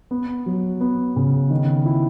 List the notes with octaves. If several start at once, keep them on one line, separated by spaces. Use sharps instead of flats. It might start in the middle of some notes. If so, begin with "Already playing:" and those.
B3
F#3
B3
C#3
D#3
E4